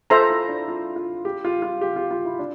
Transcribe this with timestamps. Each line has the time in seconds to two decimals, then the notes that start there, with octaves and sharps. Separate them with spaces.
0.10 F4 A4 C5 E5 A#5
0.30 E4
0.48 D4
0.68 F4
0.96 F4
1.25 G4
1.45 F4
1.62 F4
1.81 G4
1.96 F4
2.11 F4
2.25 E4
2.39 D4